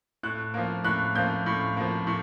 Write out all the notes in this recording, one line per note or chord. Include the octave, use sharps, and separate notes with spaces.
A2 F#6
F3 A#3
A2 F#6
F3 A#3 G6
A2
F3 A#3
A2